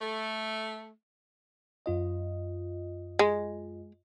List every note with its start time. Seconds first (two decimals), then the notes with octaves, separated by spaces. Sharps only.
0.01 A3
1.86 F#2 F4 D#5
3.19 G#3